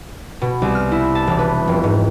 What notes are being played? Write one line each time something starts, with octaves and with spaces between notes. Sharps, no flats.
B2
C2
F6
E4
A5
E1
B4
F1
G#2